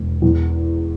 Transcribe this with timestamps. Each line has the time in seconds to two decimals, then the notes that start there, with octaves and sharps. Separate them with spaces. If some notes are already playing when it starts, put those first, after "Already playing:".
Already playing: E1
0.22 E2